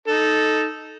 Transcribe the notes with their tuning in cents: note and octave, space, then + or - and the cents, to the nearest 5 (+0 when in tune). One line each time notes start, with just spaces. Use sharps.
D#4 +0 A4 -10